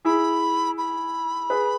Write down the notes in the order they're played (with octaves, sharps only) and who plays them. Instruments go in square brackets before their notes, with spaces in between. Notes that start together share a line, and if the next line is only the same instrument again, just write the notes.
[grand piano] E4 G#4 [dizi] B5
[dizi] B5
[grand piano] G#4 B4